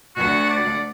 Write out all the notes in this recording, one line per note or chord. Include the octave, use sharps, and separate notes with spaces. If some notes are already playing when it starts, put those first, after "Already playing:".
D2 F#4 F#5
D5